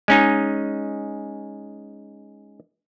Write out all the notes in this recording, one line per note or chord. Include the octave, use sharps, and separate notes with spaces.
G#3 C#4 D#4